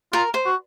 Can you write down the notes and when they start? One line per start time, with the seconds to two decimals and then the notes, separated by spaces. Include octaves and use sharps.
0.13 F4 A#4
0.34 C5
0.45 F#4